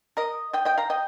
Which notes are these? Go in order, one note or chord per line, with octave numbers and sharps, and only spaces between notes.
A#4 D#5
D#5 G5
D#5 G5
F5 A#5
D#5 G5